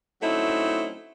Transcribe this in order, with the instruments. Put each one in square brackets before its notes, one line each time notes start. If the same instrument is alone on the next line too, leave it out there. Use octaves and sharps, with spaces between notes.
[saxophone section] F#3 A3 C4 C#4 D#4 E4